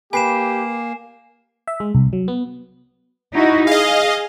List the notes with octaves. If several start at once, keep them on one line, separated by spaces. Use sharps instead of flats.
A#3 G4 B4 G#5 C7 E7
E5
G#3
C2
F#3
B3
D#4 E4 F#4
G#4 D#5 F5